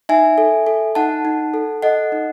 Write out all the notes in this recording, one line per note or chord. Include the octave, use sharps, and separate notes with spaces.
D#4 E5 G#5
A4
A4
D#4 F#5 A5
D#4
A4
A4 D#5 F#5
D#4